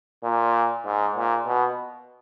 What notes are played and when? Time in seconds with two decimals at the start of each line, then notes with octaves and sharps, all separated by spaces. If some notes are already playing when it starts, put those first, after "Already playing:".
0.24 A#2
0.85 G#2
1.16 A#2
1.46 B2